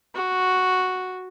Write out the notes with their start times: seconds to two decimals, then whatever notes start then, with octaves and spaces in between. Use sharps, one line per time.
0.15 F#4